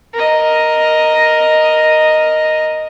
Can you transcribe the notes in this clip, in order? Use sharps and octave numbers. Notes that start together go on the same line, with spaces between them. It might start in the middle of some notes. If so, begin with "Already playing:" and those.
A#4 D#5